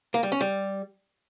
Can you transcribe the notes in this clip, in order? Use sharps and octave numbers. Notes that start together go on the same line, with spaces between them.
A#3
G3
C#4
G3